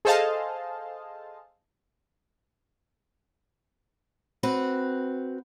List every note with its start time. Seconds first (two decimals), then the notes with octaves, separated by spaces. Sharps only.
0.05 G#4 A4 C5 D#5 F5 A5
4.43 C4 F#4 B4